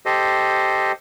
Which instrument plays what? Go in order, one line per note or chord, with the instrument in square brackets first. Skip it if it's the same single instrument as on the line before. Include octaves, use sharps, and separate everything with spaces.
[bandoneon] G4 A4 C5 D#5